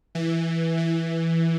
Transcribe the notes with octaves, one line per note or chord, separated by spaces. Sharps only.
E3
E3